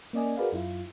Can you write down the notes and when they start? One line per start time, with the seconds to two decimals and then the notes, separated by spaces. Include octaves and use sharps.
0.13 A#3 C#4 D5 D#5 G#5
0.37 F#4 G#4 A#4 B4 D5 F5
0.52 F#2 E4 F4